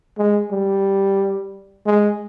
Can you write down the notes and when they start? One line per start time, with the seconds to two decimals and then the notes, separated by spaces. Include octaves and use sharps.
0.18 G#3
0.52 G3
1.86 G#3